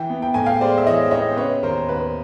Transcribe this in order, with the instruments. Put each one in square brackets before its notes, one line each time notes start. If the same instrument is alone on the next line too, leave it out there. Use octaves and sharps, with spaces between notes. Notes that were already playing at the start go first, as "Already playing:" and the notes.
Already playing: [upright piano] E3 G5
B3
G5
A2 G#5
F5 G5
G#3 C5 D5
E5
E3 C#5 D#5
B3 C#5 D#5
C5
C#3 B4 C#5
D#2 A#4 C5
D#2 B4